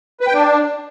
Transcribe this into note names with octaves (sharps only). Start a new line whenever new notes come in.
B4
G5
D4